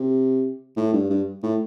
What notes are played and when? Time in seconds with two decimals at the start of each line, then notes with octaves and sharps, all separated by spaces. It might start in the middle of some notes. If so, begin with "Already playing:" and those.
Already playing: C3
0.77 A2
0.93 G2
1.10 G2
1.43 A2